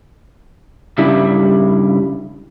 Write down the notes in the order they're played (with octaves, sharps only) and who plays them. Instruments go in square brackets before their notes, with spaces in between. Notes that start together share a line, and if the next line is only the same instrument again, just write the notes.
[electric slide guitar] G2 C#3 G3 E4